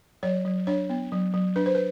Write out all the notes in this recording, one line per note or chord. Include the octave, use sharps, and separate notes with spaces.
F#3 C#5
F#3
D4 C#5
B3
F#3
F#3
D4 B4
C5
B4